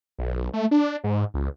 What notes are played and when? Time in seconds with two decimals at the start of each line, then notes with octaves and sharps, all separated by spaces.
0.18 B1
0.53 A3
0.71 D4
1.04 G#2
1.34 C#2